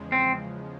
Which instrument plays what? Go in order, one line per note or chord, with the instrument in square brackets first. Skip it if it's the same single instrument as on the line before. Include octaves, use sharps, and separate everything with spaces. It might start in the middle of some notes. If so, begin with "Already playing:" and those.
Already playing: [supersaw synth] E2 C#3 F3 G#3
[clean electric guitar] C4